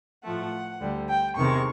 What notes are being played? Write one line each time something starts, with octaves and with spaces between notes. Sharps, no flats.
A2 F3 A3 F#5
D2 D3 G3
G5
E2 C3 D#3 G#3 C#6